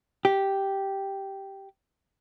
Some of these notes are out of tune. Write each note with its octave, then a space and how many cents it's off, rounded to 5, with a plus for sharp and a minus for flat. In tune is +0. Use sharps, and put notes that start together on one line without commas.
G4 -5